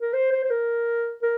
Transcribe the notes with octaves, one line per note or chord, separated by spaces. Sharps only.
A#4
C5
C5
C5
A#4
A#4